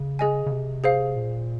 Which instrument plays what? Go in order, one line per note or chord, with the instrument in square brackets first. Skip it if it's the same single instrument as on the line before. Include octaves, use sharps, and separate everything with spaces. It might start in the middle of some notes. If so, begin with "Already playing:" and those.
Already playing: [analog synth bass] C#3
[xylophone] G#4 D#5 G#5
[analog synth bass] C#3
C3
[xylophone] G#4 C5 F5
[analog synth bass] A#2